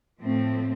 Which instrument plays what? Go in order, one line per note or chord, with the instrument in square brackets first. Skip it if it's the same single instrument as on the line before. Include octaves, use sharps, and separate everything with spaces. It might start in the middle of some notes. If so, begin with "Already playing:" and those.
[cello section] A2 F3 A3 C4